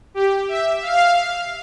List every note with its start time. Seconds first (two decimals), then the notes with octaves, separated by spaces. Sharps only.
0.14 G4
0.48 E5
0.82 F5